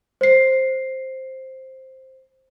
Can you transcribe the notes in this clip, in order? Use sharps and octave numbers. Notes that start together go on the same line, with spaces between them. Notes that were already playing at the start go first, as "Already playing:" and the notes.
C5 C7